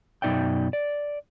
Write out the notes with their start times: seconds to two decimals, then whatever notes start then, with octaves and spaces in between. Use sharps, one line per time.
0.22 F#2 B2 D#4 D5 E5 G5
0.73 D5